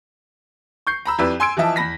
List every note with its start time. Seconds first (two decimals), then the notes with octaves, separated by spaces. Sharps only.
0.87 C#6 G6 C7
1.05 A#5 B5 E6
1.18 F2 E4 G4 B4 D5 E5
1.40 G#5 C6 E6 G#6 D7
1.57 E3 F3 D#5 E5 A5
1.76 E2 B5 A#6 B6